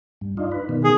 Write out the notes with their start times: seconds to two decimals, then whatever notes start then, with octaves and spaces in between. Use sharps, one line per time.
0.21 G2
0.37 D4 D#4 F4
0.52 B4
0.69 B2 D#3
0.84 G#4